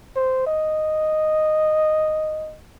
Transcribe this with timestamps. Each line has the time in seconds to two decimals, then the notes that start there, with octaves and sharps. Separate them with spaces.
0.16 C5
0.47 D#5